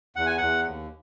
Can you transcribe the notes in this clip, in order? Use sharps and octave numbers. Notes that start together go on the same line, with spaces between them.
E2 F#5
G#5
E2 F#5
D#2